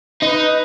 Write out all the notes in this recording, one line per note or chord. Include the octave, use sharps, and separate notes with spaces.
D#4 B4